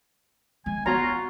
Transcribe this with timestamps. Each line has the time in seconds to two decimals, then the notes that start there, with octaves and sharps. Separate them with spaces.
0.66 G#3 G#5
0.86 B3 F4 F#4 C#5 A#5